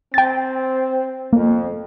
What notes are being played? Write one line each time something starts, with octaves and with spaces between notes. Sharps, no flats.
C4 G5 A6
F2 A#3